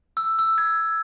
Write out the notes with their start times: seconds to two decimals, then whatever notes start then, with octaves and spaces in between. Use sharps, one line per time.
0.17 E6
0.39 E6
0.58 G#6